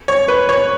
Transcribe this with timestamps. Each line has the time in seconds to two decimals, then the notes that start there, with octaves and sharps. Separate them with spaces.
0.08 C#5
0.28 B4
0.49 C#5